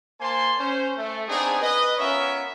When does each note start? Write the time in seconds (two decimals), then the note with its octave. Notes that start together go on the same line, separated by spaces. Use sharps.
0.20 A#3 C5 G#5 A5 C6
0.58 C#4 C5
0.97 A3
1.29 B3 C4 D4 D#4 G#4
1.61 B4 D#5
1.98 B3 C#4 F4 A#4 C#5 E5